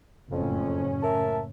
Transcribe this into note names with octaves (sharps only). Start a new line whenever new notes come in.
F#1 F2 A2 C#4
A#4 E5 A5